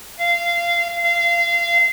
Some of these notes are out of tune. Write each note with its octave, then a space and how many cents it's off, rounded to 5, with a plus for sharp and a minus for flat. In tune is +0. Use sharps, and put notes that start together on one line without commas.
F5 -20
F5 -25